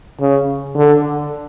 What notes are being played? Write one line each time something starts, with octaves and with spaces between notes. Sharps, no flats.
C#3
D3